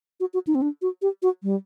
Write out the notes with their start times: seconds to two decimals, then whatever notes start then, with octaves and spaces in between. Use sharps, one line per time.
0.20 F#4
0.34 F#4
0.47 D#4
0.55 C4
0.62 D4
0.82 F#4
1.02 G4
1.22 F#4
1.43 G3